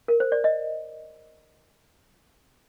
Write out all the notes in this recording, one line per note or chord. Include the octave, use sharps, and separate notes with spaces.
A#4
C5
D5
D#5